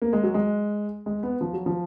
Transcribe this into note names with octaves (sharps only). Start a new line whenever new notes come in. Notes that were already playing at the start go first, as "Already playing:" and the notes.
A#3
G#3
F#3
G#3
G#3
B3
F3
F#3
F3